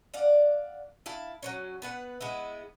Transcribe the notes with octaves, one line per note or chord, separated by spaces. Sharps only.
D5 F5 F#5
E4 F5 A5
F#3 B3 C#4
B3 B4 F#5
G#3 B3 E4